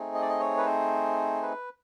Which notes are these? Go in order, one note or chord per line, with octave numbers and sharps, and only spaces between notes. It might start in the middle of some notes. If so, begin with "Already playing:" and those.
Already playing: A3 C4 D#4 G#4
D#5
D5
D#5
C#5
B4
C5
B4